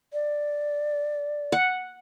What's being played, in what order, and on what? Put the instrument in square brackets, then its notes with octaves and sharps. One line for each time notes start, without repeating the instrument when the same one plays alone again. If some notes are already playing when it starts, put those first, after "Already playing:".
[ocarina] D5
[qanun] F#5